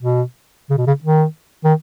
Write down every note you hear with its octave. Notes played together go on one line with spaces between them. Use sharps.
B2
C#3
B2
C#3
D#3
D#3